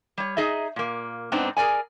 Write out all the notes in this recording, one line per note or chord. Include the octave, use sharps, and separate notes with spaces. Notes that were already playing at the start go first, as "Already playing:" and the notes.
G3 C#5
D#4 G#4 D#5 E5
A#2 A#3
G#2 B3 C4 D4 D#4
G#4 A#4 B4 D5 G#5